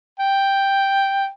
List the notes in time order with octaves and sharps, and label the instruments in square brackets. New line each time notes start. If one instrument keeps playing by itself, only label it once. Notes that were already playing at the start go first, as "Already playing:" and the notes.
[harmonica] G5